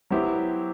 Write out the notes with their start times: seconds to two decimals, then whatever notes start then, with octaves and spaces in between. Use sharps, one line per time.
0.10 F#3 B3 E4 G4 C5